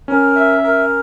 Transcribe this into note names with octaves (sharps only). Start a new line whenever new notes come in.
C#4 A#4
E5
A#4